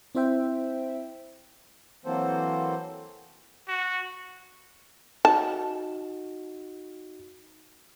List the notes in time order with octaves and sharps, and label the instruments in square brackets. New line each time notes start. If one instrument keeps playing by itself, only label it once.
[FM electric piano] C4 E4 C5 E5 G5
[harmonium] E3 F#3 A#3 C4 A4 C5
[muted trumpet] F#4
[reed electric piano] D#4 F#4 [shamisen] A5